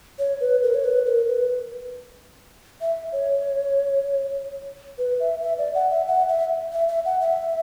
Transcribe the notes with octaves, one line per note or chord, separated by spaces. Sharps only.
C#5
B4
A#4
C#5
B4
A#4
B4
E5
C#5
B4
E5
E5
D5
F#5
E5
F#5
E5
E5
E5
F#5
E5